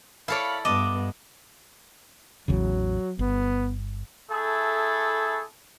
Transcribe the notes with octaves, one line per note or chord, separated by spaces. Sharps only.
E4 A4 C#5 D5 F5 B5
G2 B3 D4 D#5 D6
A1 E2 C#3 F#3
G1 B3
A3 E4 G#4 A4